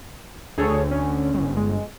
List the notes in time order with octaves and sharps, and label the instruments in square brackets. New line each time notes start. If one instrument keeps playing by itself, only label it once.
[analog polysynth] D2 [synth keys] G#4 A4 C#5
[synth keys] C#4
[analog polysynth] G1
[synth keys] G#3